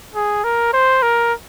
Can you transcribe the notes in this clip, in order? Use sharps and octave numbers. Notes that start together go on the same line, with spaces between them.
G#4
A#4
C5
A#4